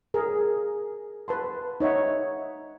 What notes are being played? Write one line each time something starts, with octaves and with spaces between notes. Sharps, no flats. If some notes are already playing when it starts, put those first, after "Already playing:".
G#4 A#4
B4 A5 C6
D#4 C#5 E5 F#5